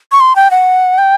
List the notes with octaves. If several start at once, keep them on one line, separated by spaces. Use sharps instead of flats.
C#6
C6
G5
F#5
G5